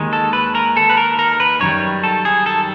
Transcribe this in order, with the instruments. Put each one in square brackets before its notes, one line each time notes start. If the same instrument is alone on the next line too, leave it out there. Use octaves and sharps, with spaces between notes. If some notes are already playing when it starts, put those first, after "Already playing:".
Already playing: [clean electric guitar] D#2 D#3 G#3
A4
B4
A#4
A4
B4
A#4
A#4
B4
F#2 D#3 G3 C#5
A4
G#4
A4